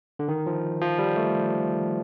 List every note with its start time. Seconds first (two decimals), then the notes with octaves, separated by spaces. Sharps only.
0.19 D3
0.28 D#3
0.46 F3
0.81 F3
0.99 G3
1.16 A3